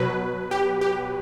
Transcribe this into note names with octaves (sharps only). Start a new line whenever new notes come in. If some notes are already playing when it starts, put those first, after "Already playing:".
Already playing: B2 F#3 B4
G4
G4